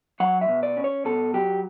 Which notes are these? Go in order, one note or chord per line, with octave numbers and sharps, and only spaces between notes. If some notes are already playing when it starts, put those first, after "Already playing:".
F#3 F#5
E5
B2
D5
C#4
C#5
B2 A4
F#3 G4